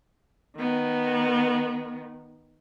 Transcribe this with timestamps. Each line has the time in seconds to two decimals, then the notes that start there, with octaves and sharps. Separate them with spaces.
0.56 D#3 B3